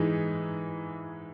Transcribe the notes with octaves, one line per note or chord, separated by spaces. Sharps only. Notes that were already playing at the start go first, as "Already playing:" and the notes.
Already playing: G#2 E3 G#3 D#4